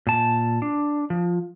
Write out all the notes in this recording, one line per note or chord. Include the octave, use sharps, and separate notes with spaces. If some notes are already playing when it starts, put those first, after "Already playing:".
A#2 A5
D4
F3